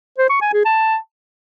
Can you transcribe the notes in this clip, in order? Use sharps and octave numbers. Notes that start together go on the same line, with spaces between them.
C5
C#6
G#5
G#4
A5